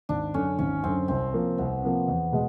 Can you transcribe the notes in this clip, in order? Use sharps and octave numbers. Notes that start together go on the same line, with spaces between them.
G#1 D4
F#2 D3 C#4
G#1 C#4
F#2 D3 C4
C2 C4
C3 F3 A#3
C2 B3
C3 F3 A#3
E2
B2 G#3